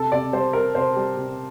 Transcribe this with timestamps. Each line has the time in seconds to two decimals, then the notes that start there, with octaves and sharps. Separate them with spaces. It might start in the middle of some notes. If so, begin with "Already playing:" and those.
Already playing: C3 A4
0.12 C3 D5
0.32 G3 C5
0.53 G3 A#4
0.75 C3 C5
0.96 G3
1.17 C3